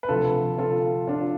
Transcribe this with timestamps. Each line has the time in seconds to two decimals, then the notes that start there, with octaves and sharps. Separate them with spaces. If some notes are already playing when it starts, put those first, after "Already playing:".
0.03 B4
0.09 D2 C3 F3 F4 A4
0.58 F4 A4
1.08 D4 F4